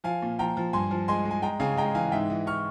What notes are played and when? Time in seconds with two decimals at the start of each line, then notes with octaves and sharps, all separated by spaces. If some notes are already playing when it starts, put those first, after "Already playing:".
0.04 F3 F5 G#5
0.22 A#2
0.39 F3 G5 A#5
0.57 F3
0.73 G2 G#5 C6
0.91 F3
1.08 G#3 G#5 C6
1.25 G#3
1.31 G#5
1.42 G#3 G5 A#5
1.60 C#3 F5 G#5
1.77 G#3 G5 A#5
1.94 E3 F5 G#5
2.12 G#2 E5 G5
2.30 E3
2.47 C#6 F6